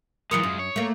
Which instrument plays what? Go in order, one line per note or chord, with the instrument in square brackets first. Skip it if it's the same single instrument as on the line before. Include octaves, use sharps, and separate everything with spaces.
[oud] E3 F#3 A#4 [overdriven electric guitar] G#3 F4 [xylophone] D#6 C#7 F7
[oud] F#2
[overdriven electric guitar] C#5
[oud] A3 A#3